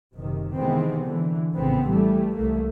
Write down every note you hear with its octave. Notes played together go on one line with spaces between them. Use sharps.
F#1 C3 D#3
C3 D#3 E3 G#3 B3 C4
D3 E3
A#1 A2 C#3 B3 C4
E3 G3 A3
C2 A3 A#3